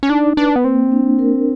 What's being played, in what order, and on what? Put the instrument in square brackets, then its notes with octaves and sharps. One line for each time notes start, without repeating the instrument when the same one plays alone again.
[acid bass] C#4
[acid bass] D4 [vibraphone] D#4
[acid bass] D4 [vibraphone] B4
[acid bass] B3
[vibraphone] A#3 [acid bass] C4
[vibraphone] D4
A#4